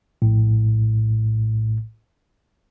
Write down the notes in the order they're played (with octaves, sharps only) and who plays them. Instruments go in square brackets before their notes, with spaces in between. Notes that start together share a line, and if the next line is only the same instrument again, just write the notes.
[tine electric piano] A#1 A2